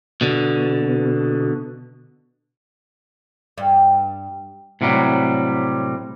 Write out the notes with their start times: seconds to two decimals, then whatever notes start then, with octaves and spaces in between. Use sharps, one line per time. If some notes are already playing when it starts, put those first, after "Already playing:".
0.21 B2 D3
3.58 G2
4.81 A2 C3 F#3 G3